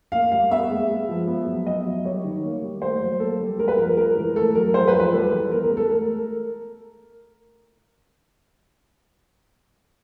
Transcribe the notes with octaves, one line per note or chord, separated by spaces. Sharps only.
A#3 F5
G3 F5
B3 E5
G#3
G#3
F3
B3
F#3
B3 D#5
F#3
G3 C#5
D#3
A#3
G3
A3 C5
F#3
A#3 A4
G3
G#3 A#4
B4
F3 A#4
G#3 A#4
E3
A3 A4
F#3 A#4
G#3 C5
B4
F3
B4
G3 A4
E3
B3 A#4
A#4
G#3
A4
A3 A#4